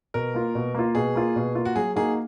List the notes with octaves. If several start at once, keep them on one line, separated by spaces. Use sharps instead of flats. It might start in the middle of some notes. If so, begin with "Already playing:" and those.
B2 A#4
A#3 F4
B2
A#3 F4
B2 G#4
A#3 F4
B2
A#3 F4
F#4
F#3 G#4
A#3 D#4 F#4 G#4